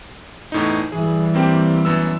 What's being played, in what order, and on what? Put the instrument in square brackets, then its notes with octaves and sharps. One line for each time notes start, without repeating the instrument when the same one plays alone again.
[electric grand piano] E2 A2 D#4
[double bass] E3 G3 [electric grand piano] G#4
[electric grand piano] A#3 C4 G4
F#2 B3 E6